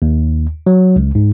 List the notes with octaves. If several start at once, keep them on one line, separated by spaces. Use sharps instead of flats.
D#2
F#3
C#2
G#2